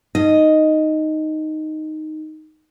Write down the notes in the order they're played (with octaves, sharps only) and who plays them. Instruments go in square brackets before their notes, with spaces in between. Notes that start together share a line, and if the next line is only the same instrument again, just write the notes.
[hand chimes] D#4 [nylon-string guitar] D#5